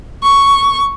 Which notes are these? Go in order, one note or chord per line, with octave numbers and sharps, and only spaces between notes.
C#6